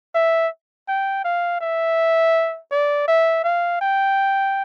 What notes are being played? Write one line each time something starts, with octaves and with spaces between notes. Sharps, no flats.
E5
G5
F5
E5
D5
E5
F5
G5